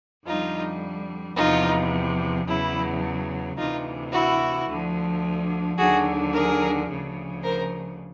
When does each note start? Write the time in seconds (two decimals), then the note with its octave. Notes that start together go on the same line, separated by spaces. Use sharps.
0.25 F2 D3 G3 D#4 F4
1.35 E2 C3 F3 D#4 F4
2.45 E2 C#3 F#3 E4
3.56 D2 C3 E3 D#4 F4
4.11 E4 F#4
4.66 D2 D3 F3
5.77 D#2 D3 F#3 F#4 G#4
6.33 G#4 A#4
6.87 D2 C#3 F3
7.43 A#4 C5